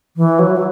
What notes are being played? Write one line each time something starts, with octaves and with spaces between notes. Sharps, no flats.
E3
F#3
F#3